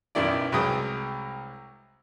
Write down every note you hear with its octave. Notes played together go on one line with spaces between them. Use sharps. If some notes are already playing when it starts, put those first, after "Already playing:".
B1 F#2 D#3 E4 D5
C2 F#3 G#3 B4 G5 D#6